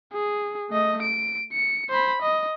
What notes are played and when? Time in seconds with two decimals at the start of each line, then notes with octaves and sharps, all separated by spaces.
0.13 G#4
0.70 A3 D#5
1.03 D7
1.53 C#7
1.90 C5 B5
2.22 D#5